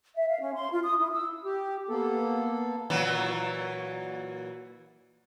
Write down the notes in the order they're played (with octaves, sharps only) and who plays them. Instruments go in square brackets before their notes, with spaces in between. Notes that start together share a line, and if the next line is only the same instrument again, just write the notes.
[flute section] E5
F5
C#4
C6
F4
D#6
E4
E6
[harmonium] G4
A#3 B3 A4
[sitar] A#2 E3 F#3